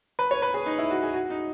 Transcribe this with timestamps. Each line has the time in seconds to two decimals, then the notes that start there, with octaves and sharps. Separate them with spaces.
0.19 B4
0.31 C#5
0.42 B4
0.54 G#4
0.66 D#4
0.78 E4
0.91 F#4
1.03 G#4
1.14 F#4
1.30 D#4